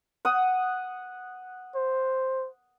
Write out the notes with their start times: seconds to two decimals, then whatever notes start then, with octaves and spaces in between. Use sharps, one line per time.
0.25 F#5 D#6
1.75 C5